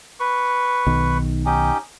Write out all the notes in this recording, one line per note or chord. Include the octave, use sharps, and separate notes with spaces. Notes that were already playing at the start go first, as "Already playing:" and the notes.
B4 C#6
B1 D#3
C#4 D#4 G4